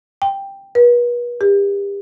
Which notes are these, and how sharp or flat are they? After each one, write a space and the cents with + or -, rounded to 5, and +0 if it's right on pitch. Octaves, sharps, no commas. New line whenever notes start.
G5 +5
B4 -40
G4 +35